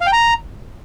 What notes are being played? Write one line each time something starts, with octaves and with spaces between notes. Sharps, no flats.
F5
G5
A#5